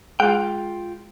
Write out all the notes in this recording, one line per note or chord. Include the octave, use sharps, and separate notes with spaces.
G#3 F4 G#4 G5